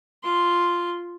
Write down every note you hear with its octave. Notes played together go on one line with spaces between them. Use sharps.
F4 C6